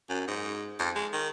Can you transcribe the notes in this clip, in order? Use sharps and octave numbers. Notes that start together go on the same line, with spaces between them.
F#2
G#2
F2
G#3
D#3